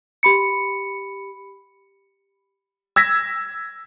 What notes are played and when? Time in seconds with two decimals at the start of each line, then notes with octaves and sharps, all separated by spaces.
0.23 G4 B5 C#7
2.96 E6 G#6 A#6 B6